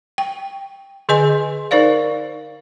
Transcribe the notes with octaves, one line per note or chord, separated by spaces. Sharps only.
G5
D3 G#4 B4 D#5 G#5 C6
D#4 A#4 C5 D5 F5